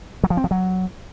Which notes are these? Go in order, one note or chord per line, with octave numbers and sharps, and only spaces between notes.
F#3
F3
C4
F3
F#3